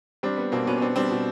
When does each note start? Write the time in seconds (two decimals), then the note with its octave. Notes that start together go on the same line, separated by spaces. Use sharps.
0.23 G3 C4 D4
0.38 B3
0.52 B2 A#3 C4
0.67 B2 B3 C#4
0.78 C#4
0.82 B3 C4 D4
0.96 G3 C4 D4
1.11 B2